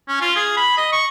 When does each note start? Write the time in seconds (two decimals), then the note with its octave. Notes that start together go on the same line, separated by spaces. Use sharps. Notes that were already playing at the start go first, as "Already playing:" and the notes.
0.08 C#4
0.21 F4
0.36 G#4
0.57 B5
0.78 D#5
0.92 C#6